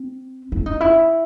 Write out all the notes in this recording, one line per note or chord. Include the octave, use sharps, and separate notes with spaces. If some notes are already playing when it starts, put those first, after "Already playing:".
Already playing: C4
E4
D#4
E4